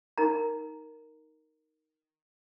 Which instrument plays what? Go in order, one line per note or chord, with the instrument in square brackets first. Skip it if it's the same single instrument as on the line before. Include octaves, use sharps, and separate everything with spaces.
[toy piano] D#4 A#4 A#5